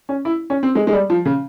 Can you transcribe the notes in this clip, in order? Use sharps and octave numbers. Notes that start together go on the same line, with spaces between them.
C#4
E4
C#4
C4
G#3
G#3
G3
F3
C#3